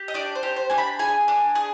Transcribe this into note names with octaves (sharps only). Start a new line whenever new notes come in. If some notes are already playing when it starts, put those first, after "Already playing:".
Already playing: G4
D#5
D4 D5
C5
G4
C5
D4 G#5
B5
G#4 G#5
D4
G#4